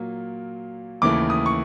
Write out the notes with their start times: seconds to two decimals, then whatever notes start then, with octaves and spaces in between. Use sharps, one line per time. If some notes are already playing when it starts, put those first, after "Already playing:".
Already playing: A#2 F#3 A#3
1.02 D#2 C#3 E3 A3 D6
1.30 D#6
1.46 C#6